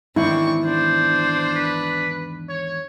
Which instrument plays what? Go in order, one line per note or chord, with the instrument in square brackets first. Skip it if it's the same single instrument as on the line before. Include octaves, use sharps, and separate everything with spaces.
[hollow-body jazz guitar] E2 G#2 D#3 [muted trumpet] C4 [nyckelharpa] D4 C#6 [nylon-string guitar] E4
[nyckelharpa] D4 [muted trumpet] C5
[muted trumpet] B4
C#5